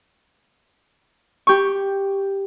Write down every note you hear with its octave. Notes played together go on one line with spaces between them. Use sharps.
G4 C#6